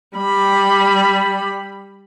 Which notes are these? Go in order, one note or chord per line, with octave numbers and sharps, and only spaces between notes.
G3 B5